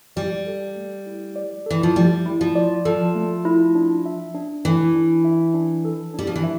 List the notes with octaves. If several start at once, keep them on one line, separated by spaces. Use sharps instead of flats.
G3 D5
A4
A3
E4
D5
E3 A4
F3
G3 A3
E4
F3
D5
F3 A4
A3
E4
D4
E5
D4
E3 A4
D4
E5
D4
A4
G3 D4
F3
E3
E5